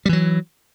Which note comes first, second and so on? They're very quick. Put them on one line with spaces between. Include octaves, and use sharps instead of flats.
G3 E3 F#3